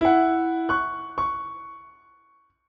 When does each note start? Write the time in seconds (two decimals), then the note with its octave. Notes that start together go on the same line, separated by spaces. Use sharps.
0.01 E4 F#5
0.69 C#6 F#6
1.18 C#6